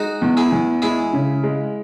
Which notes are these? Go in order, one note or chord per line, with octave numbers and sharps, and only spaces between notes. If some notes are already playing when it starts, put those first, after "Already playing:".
Already playing: G#3 D#4 F#4
E2
E4 G#4
E2
G#3 E4 G#4
C#3
G#3